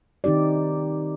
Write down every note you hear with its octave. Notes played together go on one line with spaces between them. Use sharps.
D#3 C4 D#4 G4 D5